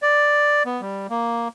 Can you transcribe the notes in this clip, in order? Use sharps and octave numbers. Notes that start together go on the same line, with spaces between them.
D5
B3
G3
A#3